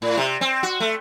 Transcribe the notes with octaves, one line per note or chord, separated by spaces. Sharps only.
A2
C3
C4
F#4
A3